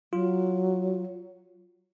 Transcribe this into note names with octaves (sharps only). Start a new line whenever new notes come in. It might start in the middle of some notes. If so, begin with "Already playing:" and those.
F#3 F4